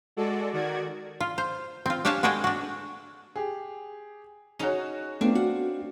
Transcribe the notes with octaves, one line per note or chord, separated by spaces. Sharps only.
G#3 F#4 A4 D5
D#3 F#4 D5 G#6
F4
C5
C4 F4
D4 G4 C#5 F5 G#5 A5
G#3 F#4 G#4 A4 D5 G5
D4 F#4
G4 G#4
C#4 D#4 F#4 G#4
A3 B3 C4 D4 F4
F#4 F#5